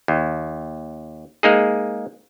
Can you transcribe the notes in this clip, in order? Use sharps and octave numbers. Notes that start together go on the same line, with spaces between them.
D#2
G#3 A#3 D#4 G#4